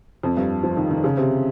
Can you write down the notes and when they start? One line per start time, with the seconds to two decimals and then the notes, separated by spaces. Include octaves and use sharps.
0.23 F2
0.37 G2
0.63 F3
0.77 D#3
0.91 D#3
1.04 C#3
1.17 C3